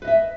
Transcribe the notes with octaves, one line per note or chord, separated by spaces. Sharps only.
B4 D#5 E5